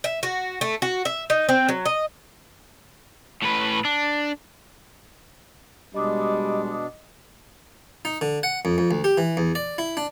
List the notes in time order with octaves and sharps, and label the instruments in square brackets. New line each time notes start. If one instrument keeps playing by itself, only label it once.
[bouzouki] E5
F#4
A3
F#4
E5
D#4
C4
F#3
D#5
[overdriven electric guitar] A2 B4
D4
[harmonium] B2 D4 [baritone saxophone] G3 [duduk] G#3 [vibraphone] D#5 D6 D#6
[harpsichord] D#4
D3
F#5
F2
F2
D2
G4
E3
E2
D5
E4
D4